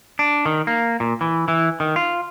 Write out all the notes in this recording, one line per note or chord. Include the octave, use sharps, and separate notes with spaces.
D4
D#3
A#3
A#2
E3
E3
D#3
F4